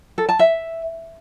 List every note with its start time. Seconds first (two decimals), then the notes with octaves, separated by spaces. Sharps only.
0.18 A4
0.29 A5
0.39 E5